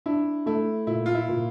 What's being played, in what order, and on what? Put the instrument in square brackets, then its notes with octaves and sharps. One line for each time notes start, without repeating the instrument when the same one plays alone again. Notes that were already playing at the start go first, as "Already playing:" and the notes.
[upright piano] D4 [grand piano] E4
[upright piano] A3 [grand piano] E4
[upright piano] A#2 [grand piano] E4
[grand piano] F4
E4
[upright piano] A#2